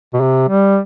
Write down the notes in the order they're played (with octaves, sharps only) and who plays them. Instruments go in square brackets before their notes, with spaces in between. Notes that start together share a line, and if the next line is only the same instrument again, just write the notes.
[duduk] B2
C3
G3